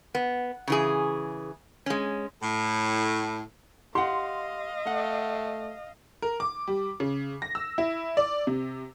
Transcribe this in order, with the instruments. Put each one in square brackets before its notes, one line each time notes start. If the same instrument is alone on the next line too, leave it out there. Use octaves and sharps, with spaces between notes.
[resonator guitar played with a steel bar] B3
C#3 E3 G#4
G#3 C#4
[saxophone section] A2
[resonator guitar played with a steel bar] G4 F#5 [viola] D#5 F5 [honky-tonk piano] C6
[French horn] A3 [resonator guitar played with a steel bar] F#5
[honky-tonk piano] A#4
D6
G3
C#3
A#6
E6
E4
D5
C3